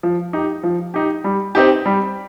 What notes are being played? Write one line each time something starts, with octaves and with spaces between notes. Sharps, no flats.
F3
D#4 G4
F3
D#4 G4
G3
C4 D#4 G4
G3